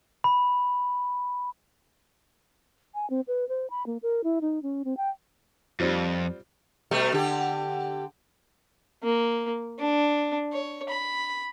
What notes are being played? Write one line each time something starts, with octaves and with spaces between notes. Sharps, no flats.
B5
G#5
C4
B4
C5
B5
A#3
A#4
E4
D#4
C#4
C4
G5
F2 G3 C4 F4
B2 G3 A3
D3 G4
A#3
D4
C#5
B5